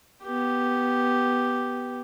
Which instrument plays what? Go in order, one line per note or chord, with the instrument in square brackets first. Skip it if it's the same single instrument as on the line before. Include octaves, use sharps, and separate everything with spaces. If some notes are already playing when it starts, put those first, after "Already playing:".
[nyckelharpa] B3 G4